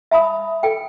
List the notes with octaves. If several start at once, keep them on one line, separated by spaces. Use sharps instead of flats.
E5 A5 B5 D#6
A4 G5